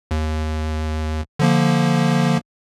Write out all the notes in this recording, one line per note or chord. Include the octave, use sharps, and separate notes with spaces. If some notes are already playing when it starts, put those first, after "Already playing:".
D#2
D3 F3 A#3